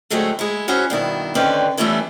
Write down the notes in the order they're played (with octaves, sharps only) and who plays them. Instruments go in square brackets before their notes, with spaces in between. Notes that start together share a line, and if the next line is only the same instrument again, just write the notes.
[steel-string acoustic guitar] D3 F#3 G#3 A3 C4
G#3 E4
C#4 E4 F#4 C5 C#5 D#5
G2 B2 D#3 E4
D3 D#3 C4 C#4 B4 D5
E3 G3 A3 B3 C#4 E4